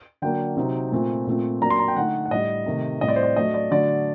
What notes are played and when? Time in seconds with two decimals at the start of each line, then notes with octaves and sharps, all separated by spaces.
0.22 D3 F#3 A#3 D4 G5
0.56 C3 F#3 C4 D#4
0.92 A#2 A3 C4
1.27 A#2 A3 C4
1.61 F#3 A#3 D4 A#5
1.70 C6
1.79 A#5
1.88 G5
1.96 D3 A3 D#4 F#5
2.26 F#5
2.31 A2 G3 D4 D#5
2.66 C3 D#3 A3
3.01 A2 G3 C4 D#5
3.08 D5
3.16 C5
3.23 D5
3.36 F#3 A3 D4 D#5
3.54 D5
3.71 D3 F#3 A3 D5